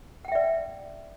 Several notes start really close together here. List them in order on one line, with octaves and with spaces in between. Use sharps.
F#5 G5 E5 D5